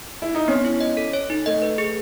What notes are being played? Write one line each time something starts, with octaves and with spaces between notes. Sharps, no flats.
E4
D#4
B3 C#4
E4
D#5
A4
C#5
D#4
A3 D#5
B4
G#4